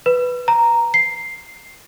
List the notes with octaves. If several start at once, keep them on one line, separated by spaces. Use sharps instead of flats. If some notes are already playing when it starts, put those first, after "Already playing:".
B4
A#5
C7